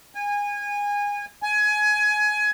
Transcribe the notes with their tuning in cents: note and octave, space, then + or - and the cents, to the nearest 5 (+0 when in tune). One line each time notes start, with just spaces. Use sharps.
G#5 -25
G#5 +20